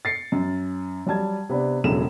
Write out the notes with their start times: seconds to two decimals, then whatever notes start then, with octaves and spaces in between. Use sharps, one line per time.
0.05 A6 C7 C#7
0.32 F#2
1.07 F#3 G3 A5 G#6
1.49 C3 B3 D4
1.84 E1 A2 C#3 F#3 E7